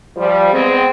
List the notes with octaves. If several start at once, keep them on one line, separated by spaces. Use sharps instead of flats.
F3 G3
G#3 B3 C4